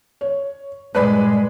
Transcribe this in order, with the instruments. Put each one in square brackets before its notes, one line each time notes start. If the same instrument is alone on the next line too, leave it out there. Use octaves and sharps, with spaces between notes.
[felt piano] C#5
[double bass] G2 A#2 [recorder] G#3 [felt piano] B4 D5 B5